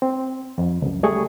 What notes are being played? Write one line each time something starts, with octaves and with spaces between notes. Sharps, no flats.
C4
F2
C#2 F#2
G3 A3 G#4 C#6